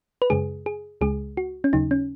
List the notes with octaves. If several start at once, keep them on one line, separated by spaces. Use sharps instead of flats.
B4
F#2 C#3 G#3 G#4
G#4
C#2 C#3 G#3 G#4
F#4
C#4
D#2 C#3 F#3 D#4
C#4